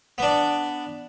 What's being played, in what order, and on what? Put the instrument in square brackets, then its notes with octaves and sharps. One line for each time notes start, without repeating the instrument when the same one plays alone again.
[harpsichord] B3 D4